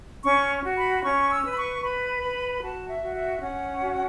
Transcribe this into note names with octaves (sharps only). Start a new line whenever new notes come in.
C#4 C#6
F#4
B5
C#4 C#6
E6
B4
B5
C#6
B4 B5
B4
F#4 A5
E5
F#4
E5
C#4 F#5
F#4